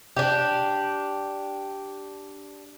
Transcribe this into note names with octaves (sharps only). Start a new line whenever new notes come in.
D4 G4